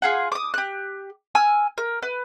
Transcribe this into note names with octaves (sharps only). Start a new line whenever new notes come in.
F4 G#4 F#5
D6 D#6
G4 F#6
G#5 E6 F6
A#4
B4